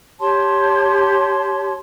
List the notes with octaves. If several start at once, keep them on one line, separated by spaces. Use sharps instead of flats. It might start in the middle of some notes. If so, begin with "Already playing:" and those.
G4 C#5 A5 C6